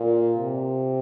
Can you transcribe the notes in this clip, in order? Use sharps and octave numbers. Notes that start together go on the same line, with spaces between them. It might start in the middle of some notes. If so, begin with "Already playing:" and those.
Already playing: A#2
C3